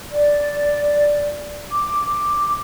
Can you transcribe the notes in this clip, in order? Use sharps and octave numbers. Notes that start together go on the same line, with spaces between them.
D5
D6